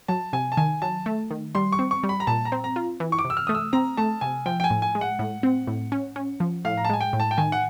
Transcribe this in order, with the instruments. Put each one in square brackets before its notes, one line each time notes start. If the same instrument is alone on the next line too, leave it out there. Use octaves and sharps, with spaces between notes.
[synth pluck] F#3 [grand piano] A5
[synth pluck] C3 [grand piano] G#5
[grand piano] A5
[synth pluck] D#3 [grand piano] G#5
[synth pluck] F#3 [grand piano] A5
[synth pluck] A3
D#3
[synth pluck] G3 [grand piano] C6
[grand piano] C#6
[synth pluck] C4
[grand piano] C#6
[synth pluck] G3
[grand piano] B5
A#5
[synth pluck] A#2 [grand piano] A5
[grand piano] A#5
[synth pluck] C4
[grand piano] A#5
[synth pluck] F4
E3
[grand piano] C#6
D6
[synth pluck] C3
[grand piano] E6
F6
[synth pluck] A3 [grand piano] D#6
[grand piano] E6
[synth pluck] C4 [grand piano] A#5
[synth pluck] A3 [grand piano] A5
[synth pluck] C3 [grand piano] G#5
[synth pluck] F3 [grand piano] G5
[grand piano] G5
G#5
[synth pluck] A2
[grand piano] G#5
[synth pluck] G#3
[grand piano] F#5
[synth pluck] A2
C4
A2
C#4
C#4
F3
[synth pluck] A2 [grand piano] F5
[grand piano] A#5
A5
[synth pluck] G#3 [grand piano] G#5
[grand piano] G5
[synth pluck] A2
[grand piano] A5
G5
[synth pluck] D#3 [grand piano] G#5
[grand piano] F#5